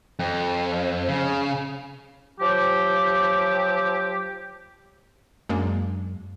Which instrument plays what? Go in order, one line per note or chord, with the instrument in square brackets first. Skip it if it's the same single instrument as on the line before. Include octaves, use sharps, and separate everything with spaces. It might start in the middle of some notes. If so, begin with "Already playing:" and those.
[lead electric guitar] F2
C#3
[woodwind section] F3 F#3 G4
[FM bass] F#2 [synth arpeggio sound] G#3 A#3 D4